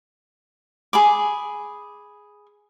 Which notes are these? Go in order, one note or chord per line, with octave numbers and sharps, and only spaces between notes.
G#4 B5 D6